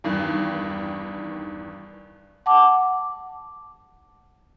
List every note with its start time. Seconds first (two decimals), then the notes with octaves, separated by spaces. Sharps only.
0.04 E2 G2 D#3
2.46 F#5 A5 D6